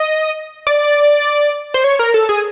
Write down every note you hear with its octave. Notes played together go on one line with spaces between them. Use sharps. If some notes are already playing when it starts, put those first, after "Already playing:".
Already playing: D#5
D5
C5
C#5
A#4
A4
G#4